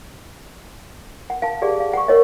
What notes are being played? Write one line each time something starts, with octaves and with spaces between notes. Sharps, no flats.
F#5
F5 A5
G4 G#4 D5 F5 F#5
F5
F#5 C#6
A#4 C#5 D#5